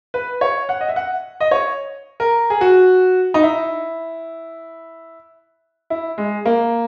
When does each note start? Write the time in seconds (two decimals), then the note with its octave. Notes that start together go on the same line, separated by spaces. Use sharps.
0.14 B4
0.41 C#5
0.69 F#5
0.81 D#5
0.89 E5
0.96 F#5
1.40 D#5
1.51 C#5
2.20 A#4
2.50 G#4
2.61 F#4
3.34 D#4
3.43 E4
5.90 E4
6.18 G#3
6.45 A#3